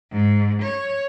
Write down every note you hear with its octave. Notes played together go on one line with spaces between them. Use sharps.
G#2
C#5